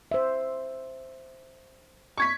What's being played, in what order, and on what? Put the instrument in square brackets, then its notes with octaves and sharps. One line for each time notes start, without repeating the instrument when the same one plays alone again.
[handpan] C5 E5
[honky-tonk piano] C#6 G#6 B6